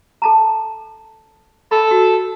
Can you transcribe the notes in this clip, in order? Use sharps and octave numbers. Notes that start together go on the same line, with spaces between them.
A4 A5 A#5
A4 B5
F#4